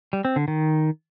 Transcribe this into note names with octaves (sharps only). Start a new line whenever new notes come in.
G3
C4
D3
D#3